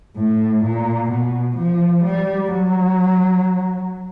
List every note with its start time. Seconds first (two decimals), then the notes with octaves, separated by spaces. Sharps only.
0.17 A2
0.64 A#2
1.10 B2
1.57 F3
2.04 G3
2.52 F#3